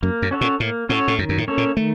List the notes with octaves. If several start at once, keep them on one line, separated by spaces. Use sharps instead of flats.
F#2 A#3
F#2
C#4 F#4 A4 C#5
A#2
A2 A#3
A2 C#4 F#4 A4 C#5
A2
F#2 D#3
F#2
A2
A#3 C#4 A4 C#5
A#2
D#3 A3